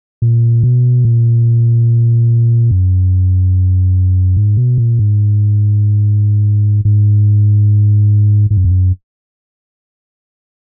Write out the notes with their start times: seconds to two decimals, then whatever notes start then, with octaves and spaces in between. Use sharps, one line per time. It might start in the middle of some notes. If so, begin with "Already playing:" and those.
0.22 A#2
0.63 B2
1.05 A#2
2.71 F#2
4.37 G#2
4.57 B2
4.78 A#2
4.99 G#2
6.85 G#2
8.50 G#2
8.57 F#2
8.65 F2
8.71 F#2